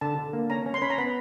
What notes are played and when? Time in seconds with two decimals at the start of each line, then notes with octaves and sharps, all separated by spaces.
0.01 D3 A5
0.18 D3
0.33 A#3
0.50 C#4 A#5
0.66 C#4
0.74 C6
0.82 C#4 B5
0.90 A#5
0.98 B3 B5